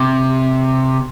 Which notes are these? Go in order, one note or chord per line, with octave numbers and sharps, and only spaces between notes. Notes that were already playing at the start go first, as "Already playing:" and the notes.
Already playing: C3